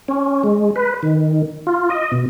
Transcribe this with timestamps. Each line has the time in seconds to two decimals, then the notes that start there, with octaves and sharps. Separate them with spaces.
0.08 C#4
0.44 G#3
0.76 B4
1.03 D#3
1.67 F4
1.90 D#5
2.12 B2